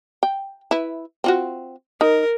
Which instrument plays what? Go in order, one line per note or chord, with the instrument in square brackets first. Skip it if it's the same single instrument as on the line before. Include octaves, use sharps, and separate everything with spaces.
[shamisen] G5
E4 B4
C4 F4 F#4
[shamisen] D#4 [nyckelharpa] A#4